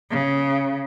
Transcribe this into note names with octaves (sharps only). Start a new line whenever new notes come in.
C#3